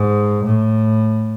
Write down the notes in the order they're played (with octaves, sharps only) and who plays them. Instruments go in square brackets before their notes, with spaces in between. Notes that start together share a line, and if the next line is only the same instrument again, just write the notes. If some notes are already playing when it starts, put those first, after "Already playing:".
Already playing: [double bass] G#2
A2